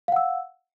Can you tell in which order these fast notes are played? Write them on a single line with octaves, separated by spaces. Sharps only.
F5 F#5 E6